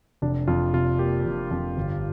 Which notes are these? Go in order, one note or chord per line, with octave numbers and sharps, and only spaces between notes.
F1 D4
F2 F4
C3 F4
A#3 G4
F1
F2
G1